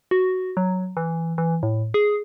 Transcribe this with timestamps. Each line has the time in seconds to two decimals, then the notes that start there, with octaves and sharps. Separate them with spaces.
0.11 F#4
0.57 F#3
0.97 E3
1.38 E3
1.63 A2
1.94 G#4